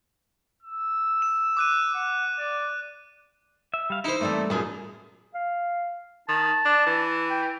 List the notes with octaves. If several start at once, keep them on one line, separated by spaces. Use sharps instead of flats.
E6
E7
D6 F#6 D#7
F#5
D5
E5
G3 F5
D#4 E4 C5
E3 G3 A3 A#3 C4 A4
F#2 A#2 B3 D#4 G#4 A#4
F5
D#3 A5
D4
E3
G5